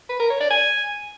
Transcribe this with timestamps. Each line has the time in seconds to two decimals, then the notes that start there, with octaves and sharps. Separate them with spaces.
0.09 B4
0.20 A#4
0.30 C#5
0.40 D5
0.51 G#5